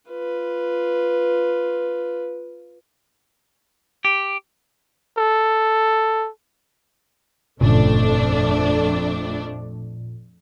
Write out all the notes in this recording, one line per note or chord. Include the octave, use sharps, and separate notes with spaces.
F4 B4
G4
A4
G1 F2 A#2 C#3 A3 D4